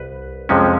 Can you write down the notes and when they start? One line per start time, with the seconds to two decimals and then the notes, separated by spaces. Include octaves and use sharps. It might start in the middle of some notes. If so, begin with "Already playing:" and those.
Already playing: C2 B4
0.49 F2 C3 F3 G#3 C#4